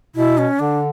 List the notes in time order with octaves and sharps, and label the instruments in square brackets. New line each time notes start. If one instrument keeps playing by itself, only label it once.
[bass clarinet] B2 [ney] E4
[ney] C#4
[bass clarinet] D3 [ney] D4